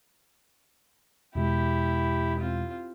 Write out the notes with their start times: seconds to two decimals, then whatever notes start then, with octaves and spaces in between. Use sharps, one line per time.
1.35 E2 B2 G#3 E4 G4
2.40 C4 F4